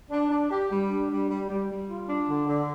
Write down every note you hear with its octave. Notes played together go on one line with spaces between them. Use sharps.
D4
D4
G4
G3
D4
G3
G3
G3
G3
F4
D4
D3
D3